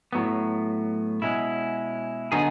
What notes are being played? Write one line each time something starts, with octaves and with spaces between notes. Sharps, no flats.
A2 F#3 B3
B2 G#3 C#4 E4
D3 F#3 B3 D#4 G#4